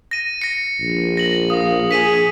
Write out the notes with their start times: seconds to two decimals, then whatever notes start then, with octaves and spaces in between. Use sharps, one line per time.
0.11 A#6 D#7
0.42 A#6 C#7
0.80 A#1
1.17 A#6 F#7
1.50 F5 D#6
1.91 G#4 B6 D#7 F#7